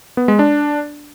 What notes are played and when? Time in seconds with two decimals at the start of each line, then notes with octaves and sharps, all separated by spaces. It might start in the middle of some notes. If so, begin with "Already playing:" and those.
0.17 B3
0.28 G#3
0.39 D4